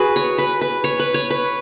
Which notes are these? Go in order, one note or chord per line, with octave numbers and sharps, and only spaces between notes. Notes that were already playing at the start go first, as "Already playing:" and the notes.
Already playing: F#4 G#4 B4
C#5
B4
B4
C#5
B4
C#5
B4